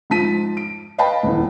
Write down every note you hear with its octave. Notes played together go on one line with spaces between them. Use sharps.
G#2 F3 A5 B6 D#7
D7
B4 D#5 F5 G5 A5 B5
D#1 E2